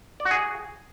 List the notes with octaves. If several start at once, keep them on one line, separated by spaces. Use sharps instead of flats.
D5
F#4
G#4